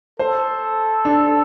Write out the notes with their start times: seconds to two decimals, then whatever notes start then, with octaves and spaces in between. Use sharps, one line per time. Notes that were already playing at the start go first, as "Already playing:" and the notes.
0.19 A4 C5
1.05 D4